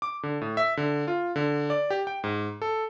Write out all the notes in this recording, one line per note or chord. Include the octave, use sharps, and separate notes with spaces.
D6
D3
A2
E5
D3
F4
D3
D5
G4
G5
G#2
A4